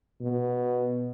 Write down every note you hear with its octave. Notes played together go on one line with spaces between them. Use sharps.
B2